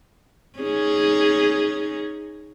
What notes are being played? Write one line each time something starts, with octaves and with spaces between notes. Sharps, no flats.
C#4 D#4 G#4